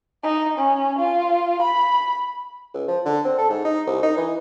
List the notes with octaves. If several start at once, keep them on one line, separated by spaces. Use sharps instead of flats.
D#4
C#4
F4
B5
C#2
F3
D3
C4
A4
G#2
D#4
C2
D#4
E3